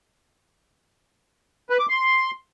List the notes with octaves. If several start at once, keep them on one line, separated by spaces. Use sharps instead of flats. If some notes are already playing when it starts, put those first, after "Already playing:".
B4
D6
C6